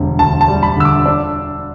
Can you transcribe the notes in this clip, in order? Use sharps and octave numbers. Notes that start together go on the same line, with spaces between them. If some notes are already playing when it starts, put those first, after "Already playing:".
Already playing: E1 D3 G3
D2 A5
A5
G3
B5
D3 E6
D6
D4